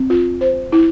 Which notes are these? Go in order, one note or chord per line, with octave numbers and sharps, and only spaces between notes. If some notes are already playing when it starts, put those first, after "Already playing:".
Already playing: C4
F4
C5
E4